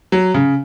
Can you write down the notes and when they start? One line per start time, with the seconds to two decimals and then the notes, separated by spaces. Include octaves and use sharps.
0.12 F#3
0.34 C#3